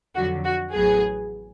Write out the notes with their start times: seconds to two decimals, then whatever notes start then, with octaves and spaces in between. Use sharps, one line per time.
0.15 F2 D3 F#3 F#4
0.44 F#4
0.74 A1 A2 F#3 B3 G#4